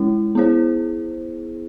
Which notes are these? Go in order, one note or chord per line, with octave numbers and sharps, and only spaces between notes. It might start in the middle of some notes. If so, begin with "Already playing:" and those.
Already playing: G#3 C#4 E4
B3 E4 G#4 C5